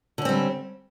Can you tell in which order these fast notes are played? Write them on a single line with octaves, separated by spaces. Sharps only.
D3 C#4 C4 G3